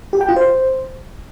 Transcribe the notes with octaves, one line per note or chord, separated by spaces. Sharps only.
G4
G5
F4
C5